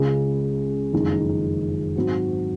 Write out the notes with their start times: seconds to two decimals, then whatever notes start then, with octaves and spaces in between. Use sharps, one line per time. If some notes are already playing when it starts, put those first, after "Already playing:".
Already playing: C#2 C#3 G#3
0.93 F#1 F2 D#3 G#3 D#4
1.96 G#2 F#3 C4 F#4